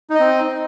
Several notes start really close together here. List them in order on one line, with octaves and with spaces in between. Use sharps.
D#4 D#5 C4